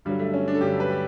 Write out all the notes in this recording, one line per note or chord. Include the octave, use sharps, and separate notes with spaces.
G2 D3 F#3 G3
A3
C#4
D4
A4
G2 D3 F#3 G4
B4
G4